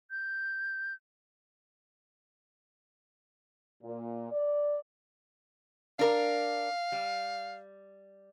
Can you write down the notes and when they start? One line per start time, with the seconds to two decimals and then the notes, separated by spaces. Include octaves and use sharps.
0.11 G6
3.83 A#2
4.32 D5
5.99 D4 A#4 F5
6.92 G3